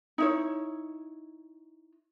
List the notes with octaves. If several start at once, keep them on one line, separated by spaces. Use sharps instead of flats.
D#4 E4 C#5